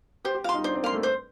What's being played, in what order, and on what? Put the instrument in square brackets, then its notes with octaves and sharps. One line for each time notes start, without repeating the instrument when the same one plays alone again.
[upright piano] G4 [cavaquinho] C5
[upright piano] G4
[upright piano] F4 [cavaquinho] F5
[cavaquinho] C6
[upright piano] D#4
[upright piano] D4 [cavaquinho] C5
[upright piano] C4
[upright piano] A#3 [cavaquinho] F5 C6
[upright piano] A3
[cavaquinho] C5